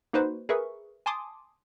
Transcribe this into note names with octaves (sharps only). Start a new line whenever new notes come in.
A#3 D#4 F#4 B4 C5
G#4 A#4 B4 E5 C#6
G#5 A5 C6 D6 D#6